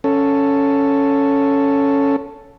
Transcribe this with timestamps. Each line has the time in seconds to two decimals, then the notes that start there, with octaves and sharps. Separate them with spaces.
0.04 C#4 A4